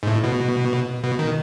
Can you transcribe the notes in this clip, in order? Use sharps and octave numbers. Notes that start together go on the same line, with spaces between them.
G#2
A2
B2
B2
D#3